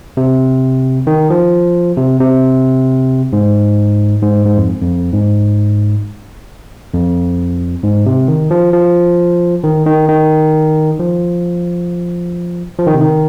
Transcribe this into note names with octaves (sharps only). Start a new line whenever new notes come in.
C3
D#3
F3
C3
C3
G#2
G#2
G#2
F2
F2
G#2
F2
G#2
C3
D#3
F3
F3
D#3
D#3
D#3
F3
F3
D#3
C3
D#3